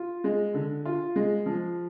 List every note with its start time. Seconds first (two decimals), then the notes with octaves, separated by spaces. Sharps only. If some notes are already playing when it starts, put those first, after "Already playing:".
Already playing: F4
0.24 G#3
0.54 D3
0.85 F4
1.16 G#3
1.46 F3